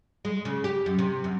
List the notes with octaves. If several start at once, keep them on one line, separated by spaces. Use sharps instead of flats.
G#3
C#3
G4
F#2
C3
F#2